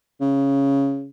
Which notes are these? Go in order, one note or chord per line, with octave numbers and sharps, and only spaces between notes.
C#3